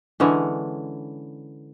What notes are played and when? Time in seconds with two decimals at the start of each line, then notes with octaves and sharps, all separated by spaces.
0.20 D3 E3 G#3 C#4